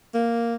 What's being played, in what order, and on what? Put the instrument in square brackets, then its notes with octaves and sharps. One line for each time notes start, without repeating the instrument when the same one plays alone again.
[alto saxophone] A#3